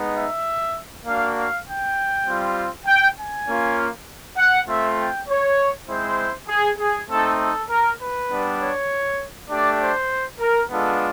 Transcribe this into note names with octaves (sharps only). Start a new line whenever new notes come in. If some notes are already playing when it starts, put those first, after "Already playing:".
Already playing: G#3 B3 D#4
E5
A#3 D4 F#4 F5
F5
G5
G3 C4 F4
G5
G#5
A#3 C#4 F4
F#5
A3 C4 F4 E5
G5
C#5
G#3 C4 E4 C5
G#4
G#4
A3 C4 D#4 A4
A4
A#4
B4
G3 B3 D4
C#5
A3 D4 G4 D5
C5
A#4
G#3 B3 D4 F4 A4